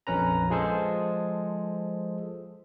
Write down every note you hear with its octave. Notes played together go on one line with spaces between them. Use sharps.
A#1 F2 C#4 B4 A#5
F3 G#3 G#4 A4 C5